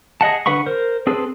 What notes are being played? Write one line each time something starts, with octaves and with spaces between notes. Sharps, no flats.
G#4 D#5 F#5 A5
D3 B4 F#5 B5 C#6
A#4 C5
C4 G#4 A4 B4